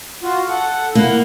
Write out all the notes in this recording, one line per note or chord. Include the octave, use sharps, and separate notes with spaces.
F4 F#4
A4 F#5
A#3 E4 F#5